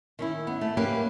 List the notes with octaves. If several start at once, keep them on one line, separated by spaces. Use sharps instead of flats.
D#3 C#4 E4
B3
A3
F#3 A#3 C#4 G4 B4